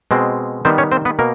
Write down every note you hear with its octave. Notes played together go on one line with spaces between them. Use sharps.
B2 G#3 C4
D#3 G3 B3 C4 C5
C#4 C#5
C4 C5
B3 B4
B2 A#3 A#4